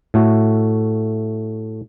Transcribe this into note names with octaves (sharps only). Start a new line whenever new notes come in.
A2 A3 F#4